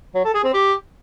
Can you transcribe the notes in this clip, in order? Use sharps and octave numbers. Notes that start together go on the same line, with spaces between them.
F#3
A4
G#4
C4
G4